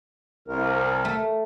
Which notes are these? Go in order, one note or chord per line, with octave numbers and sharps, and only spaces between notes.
C2 A#4
A3